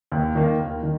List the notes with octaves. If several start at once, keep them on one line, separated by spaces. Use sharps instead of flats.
D#2
D#3 A#3
D#2
D#3